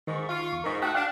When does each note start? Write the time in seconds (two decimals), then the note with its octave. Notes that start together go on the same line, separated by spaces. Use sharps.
0.07 G#2 D#3 C#6
0.29 F4
0.52 E2
0.64 G#2 D#4 A#4
0.82 A3 F#4 G5 D#6 F#6
0.95 D4 F5